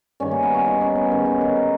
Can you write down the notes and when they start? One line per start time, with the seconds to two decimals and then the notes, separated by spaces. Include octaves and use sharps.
0.20 G2 D#3 C#4
0.31 A#3
0.43 B3
0.54 C#4
0.65 D#4
0.81 C#4
0.96 B3
1.11 G#2 D#3 C#4
1.26 D#4
1.41 A#4
1.56 A#4